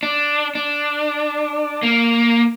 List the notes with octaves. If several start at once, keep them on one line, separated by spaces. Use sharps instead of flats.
D4
D4
A#3